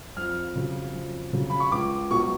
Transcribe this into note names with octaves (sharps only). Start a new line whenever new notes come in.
F2 F6
C#3 F#3
F2
C#3 F#3
B5
C#6
C#2 D6
B2 F#3 C#6